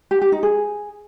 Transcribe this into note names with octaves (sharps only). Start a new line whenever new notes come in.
G4
G4
D#4
G#4